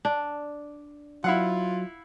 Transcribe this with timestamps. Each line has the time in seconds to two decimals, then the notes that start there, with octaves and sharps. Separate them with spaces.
0.05 D4
1.24 F#3 E4 F4 F5 F#5